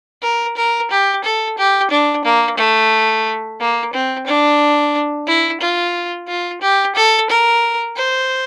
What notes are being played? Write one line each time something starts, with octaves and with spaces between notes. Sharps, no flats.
A#4
A#4
G4
A4
G4
D4
A#3
A3
A#3
C4
D4
E4
F4
F4
G4
A4
A#4
C5